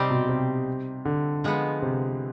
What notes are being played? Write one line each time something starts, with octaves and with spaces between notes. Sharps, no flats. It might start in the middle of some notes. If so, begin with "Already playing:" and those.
Already playing: C3 G3 C4 D#4 G4 C5
B2
C3
D3
F3 G#3 B3
C3